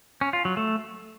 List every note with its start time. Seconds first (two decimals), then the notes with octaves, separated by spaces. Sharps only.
0.21 C#4
0.33 F4
0.45 F#3
0.57 A3